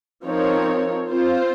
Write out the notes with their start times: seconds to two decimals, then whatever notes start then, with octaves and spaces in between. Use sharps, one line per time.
0.25 F3 C4 D#4 A#4 C#5
1.08 C4 F4 C5